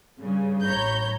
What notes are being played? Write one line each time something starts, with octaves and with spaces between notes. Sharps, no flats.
G2 C#3
A1 C#5 A#5 B5 G6